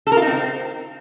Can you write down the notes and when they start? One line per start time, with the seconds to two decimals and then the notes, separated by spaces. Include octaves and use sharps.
0.07 A4
0.12 A#4
0.17 F4
0.22 D#4
0.27 C4